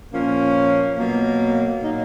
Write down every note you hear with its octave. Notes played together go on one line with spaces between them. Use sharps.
A#2 F3 A#3 C#4
B2 F#3 A#3
A#2 F#3 A#3 D#4